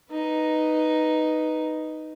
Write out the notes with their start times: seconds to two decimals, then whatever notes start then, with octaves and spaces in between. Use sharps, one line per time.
0.12 D#4 B4